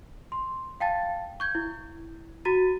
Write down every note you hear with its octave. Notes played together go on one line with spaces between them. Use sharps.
C6
F5 G5 A5 A6
C#6 G6 G#6
E4
F#4 A#5 A6 D#7